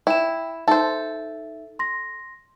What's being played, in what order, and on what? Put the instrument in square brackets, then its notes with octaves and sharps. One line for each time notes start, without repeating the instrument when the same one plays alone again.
[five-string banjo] E4 [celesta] G5 E7
[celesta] D#4 E5 [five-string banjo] A4 C5
[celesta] C6 A#6